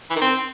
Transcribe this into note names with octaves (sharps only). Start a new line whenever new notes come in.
E3
D#3
C4